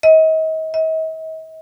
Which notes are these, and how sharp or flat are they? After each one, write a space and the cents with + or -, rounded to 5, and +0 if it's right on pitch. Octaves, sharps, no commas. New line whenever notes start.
D#5 +35
D#5 +45